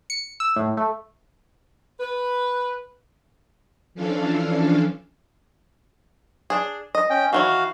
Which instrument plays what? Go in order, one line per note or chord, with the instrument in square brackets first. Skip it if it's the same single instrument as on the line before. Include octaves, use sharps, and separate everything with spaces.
[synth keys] C#7
E6
A2
A3
[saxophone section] B4
[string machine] E3 F3 C#4 D4 A4 F5
[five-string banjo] D4 G#4
D#5
[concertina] C#4 G5
[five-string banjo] D#3 E3 C#5 [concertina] F#4 F5